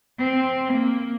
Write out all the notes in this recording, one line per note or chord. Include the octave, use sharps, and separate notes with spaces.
C4
A#3